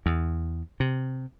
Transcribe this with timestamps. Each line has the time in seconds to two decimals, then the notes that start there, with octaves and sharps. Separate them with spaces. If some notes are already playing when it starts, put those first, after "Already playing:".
0.06 E2
0.80 C3